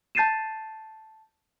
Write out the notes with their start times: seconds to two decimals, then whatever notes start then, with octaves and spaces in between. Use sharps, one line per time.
0.15 A5 G6 A6 C7 D#7 E7